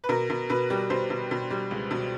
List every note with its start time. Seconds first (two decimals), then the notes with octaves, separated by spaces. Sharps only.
0.04 B4
0.09 B2 A#4
0.30 B2
0.49 B2 B4
0.70 G3
0.90 B2 C5
1.10 B2
1.31 B2
1.51 G3
1.71 C#2
1.91 B2